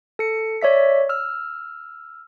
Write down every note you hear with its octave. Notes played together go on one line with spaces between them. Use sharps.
A4 C#7
C#5 D5 E5 B6
E6 F6